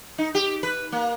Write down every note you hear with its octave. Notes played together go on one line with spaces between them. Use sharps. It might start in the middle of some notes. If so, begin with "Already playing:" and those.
D#4
G4
B4
A#3